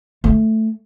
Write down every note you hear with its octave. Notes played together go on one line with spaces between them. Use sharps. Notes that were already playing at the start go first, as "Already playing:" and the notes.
A3